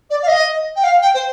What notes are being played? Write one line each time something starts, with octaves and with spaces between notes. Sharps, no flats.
D5
F5
D#5
G5
F5
G5
C5